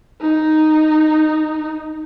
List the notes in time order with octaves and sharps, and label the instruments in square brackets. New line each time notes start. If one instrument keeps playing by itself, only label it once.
[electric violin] D#4